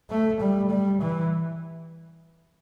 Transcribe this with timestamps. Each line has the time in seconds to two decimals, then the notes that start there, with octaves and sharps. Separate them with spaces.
0.10 A3
0.40 G3
0.70 G3
1.01 E3